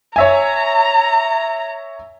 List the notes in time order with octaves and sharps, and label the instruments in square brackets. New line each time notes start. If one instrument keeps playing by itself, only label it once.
[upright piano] C#5 E5 G#5 [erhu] A#5